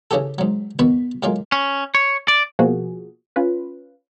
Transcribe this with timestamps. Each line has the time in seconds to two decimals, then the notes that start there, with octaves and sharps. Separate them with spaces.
0.11 C#3 E3 C#4 G4 A4
0.38 G#2 F#3
0.79 D#2 B2 B3 F#4 B4 B5
1.23 A2 F#3 G#3 A#3 F4
1.52 C#4
1.95 C#5
2.28 D5
2.59 B2 F3 A#3 F#4 G#4
3.36 C#4 F4 B4